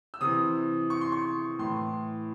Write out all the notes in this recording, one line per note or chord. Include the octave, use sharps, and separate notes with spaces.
E6
C3 E3 D#6
C#6
C6
C#6
A2 E3 C6